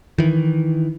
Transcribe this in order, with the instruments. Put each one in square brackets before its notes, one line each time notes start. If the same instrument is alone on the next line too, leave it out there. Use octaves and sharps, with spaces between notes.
[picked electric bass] D#3 E3